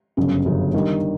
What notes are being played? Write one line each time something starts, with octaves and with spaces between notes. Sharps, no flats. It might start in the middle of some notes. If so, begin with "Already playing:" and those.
G1 F#2 C#3
G1 F#2 C#3
G2 D#3 G3